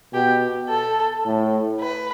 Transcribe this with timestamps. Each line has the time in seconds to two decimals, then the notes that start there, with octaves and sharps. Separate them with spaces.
0.13 B2 G4
0.69 A4
1.25 A2
1.80 B4